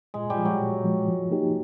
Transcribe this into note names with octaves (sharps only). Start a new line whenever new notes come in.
A#2 G#3
G3
F3 G#3
F#3
A#2
F3 G#3
F3
A#3 D#4 G4